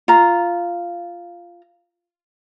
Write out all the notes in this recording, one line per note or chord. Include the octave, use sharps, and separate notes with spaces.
F4 A#5